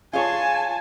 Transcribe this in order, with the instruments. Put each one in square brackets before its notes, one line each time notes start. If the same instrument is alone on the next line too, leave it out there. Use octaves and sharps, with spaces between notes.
[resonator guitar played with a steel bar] F4 G#4 C#5 [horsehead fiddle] G#5 A5